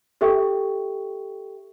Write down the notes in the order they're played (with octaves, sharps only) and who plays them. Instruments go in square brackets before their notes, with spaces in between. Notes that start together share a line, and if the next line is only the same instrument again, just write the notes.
[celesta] G4 A4 E5 G5 C#6